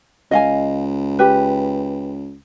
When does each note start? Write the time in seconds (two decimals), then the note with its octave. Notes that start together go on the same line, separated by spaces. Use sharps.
0.31 C#2 D#5 F5 G#5
1.19 G4 B4